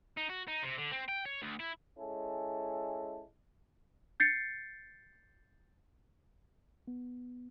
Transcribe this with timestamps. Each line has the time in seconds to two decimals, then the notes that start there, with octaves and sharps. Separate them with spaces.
0.17 D#4
0.29 F#4
0.47 D#4
0.63 C3
0.78 D3
0.92 C4
1.09 G5
1.26 C#5
1.42 D2
1.60 E4
1.98 G#3 C#4 E4 A4
4.20 G6 A6 C7 C#7
6.87 B3